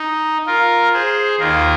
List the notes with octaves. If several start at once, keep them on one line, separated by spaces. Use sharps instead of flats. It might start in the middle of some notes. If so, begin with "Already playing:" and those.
Already playing: D#4
F4 A#4
G#4 C5
D#2 D#3 F4 A#4